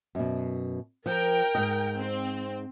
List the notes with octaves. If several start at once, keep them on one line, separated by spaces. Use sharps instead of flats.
F#2 B2
F3 A#4 G5
G#2 D#5
C4